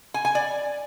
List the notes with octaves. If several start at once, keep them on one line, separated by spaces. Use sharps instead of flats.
G#5
G#5
D5